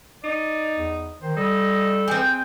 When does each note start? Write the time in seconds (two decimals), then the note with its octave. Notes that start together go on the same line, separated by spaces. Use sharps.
0.24 D#4 D5
0.77 E2
1.22 D#3 C5
1.37 G3 A4 D#5
2.08 G#3 C4 G5